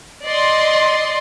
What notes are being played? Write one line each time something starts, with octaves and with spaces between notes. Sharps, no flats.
D5 D#5 C6